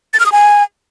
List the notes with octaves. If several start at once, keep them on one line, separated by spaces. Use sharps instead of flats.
A6
F6
D#6
G#5